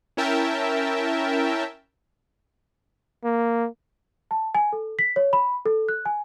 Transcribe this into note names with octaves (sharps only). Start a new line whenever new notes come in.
C#4 E4 A#4 E5 G5 A5
A#3
A5
G#5
A4
B6
C#5
B5
A4
F#6
G#5